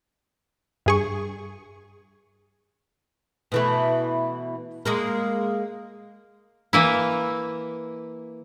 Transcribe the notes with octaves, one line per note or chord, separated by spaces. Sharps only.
G2 G#4 C#6
B2 E3 A3
G#3 A#3 A#4
E3 A#3 E4